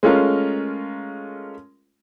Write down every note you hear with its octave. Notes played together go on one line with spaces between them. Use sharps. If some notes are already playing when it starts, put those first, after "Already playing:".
G#3 A3 C#4 F4 A#4